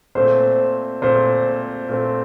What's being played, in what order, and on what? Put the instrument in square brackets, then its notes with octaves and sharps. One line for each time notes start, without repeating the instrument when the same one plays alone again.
[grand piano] A#2 A3 C4 [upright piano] C5
[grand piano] A#2 A3 C4 [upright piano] C5
[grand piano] A#2 A3 C4